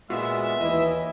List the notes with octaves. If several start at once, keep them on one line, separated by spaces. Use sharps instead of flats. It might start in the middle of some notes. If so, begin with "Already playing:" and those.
A#2 G#3 B3 F4 F#4 E5
D#2 E3 E4 D#5